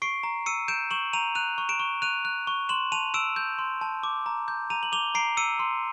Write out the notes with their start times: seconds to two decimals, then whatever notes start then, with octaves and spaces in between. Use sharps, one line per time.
0.02 C#6 C7 D7
0.23 A#5
0.46 E6 C#7 D#7
0.68 G6 D7 E7
0.91 C#6 E7 F#7
1.13 A#5 D#7 F7
1.35 F#6 D#7 F7
1.58 C#6
1.69 D7 E7
1.80 C#6
2.02 F#6 D#7 F7
2.25 F#6
2.47 C#6
2.69 C6 E7 F#7
2.92 A5 D#7 F7
3.14 E6 D7 E7
3.36 G6
3.59 C6
3.81 A5
4.03 D6
4.26 A#5
4.48 G6
4.70 A#5 D#7 F7
4.83 F#7
4.92 D6 F7 G7
5.15 A#5 C7 D7
5.37 E6 C#7 D#7
5.59 C6